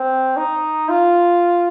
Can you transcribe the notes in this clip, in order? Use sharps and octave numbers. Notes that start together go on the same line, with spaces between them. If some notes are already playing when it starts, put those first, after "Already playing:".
Already playing: C4
D#4
F4